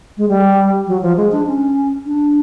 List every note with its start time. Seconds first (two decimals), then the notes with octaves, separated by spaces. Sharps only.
0.18 G#3
0.29 G3
0.87 F#3
1.02 F3
1.17 G#3
1.32 D4
1.47 C#4
2.06 D4